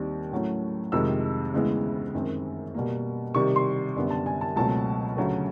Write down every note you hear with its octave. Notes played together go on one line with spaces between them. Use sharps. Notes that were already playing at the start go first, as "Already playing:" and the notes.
Already playing: D#2 D#3 G3 C4
A2 F#3 A3 C#4
F2 C3 D#3 G#3 E6
D2 C#3 E3 G#3 B3
F#2 D#3 G#3 C4
B2 G3 A#3
C3 D#3 G3 C#6
C6
F#2 D3 G3 B3
A5
G#5
A5
C#2 B2 F#3 A3 C4 A5
D2 C#3 F#3 A3